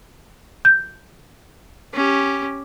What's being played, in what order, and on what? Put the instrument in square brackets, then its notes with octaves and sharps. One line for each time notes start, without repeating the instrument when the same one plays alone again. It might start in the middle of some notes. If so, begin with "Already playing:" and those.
[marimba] G6
[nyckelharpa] C#4 G4